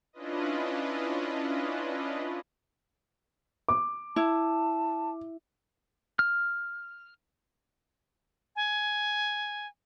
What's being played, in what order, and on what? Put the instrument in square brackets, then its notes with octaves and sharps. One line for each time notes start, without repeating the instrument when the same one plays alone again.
[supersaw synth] C#4 D4 E4 F4 B4 D#5
[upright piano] D6
[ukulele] E4 [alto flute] A5
[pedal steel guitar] F6
[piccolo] G#5